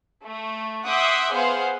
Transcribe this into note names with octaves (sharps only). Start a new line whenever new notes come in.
A3
E5 F#5 C6 D6 D#6 G6
B3 G#4 C5 F5 F#5